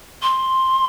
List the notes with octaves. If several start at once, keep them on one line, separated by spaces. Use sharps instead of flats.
C6